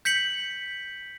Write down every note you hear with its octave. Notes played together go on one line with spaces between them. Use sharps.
G6 B6 C#7 F#7